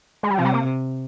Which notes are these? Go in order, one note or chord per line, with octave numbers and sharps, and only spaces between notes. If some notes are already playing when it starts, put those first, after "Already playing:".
G#3
G3
C3 F3
G3
A#3